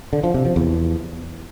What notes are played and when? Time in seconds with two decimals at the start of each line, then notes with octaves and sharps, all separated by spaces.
0.13 D3
0.24 F3
0.34 C3
0.45 F3
0.56 E2